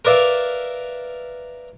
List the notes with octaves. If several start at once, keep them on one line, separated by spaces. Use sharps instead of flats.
A#4 B4 D5 E5 F5